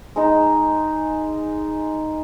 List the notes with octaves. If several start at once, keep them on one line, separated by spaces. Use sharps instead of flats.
G#3 D#4